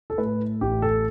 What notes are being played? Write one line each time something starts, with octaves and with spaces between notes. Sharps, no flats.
A4
A2 B4
A1 G4
A4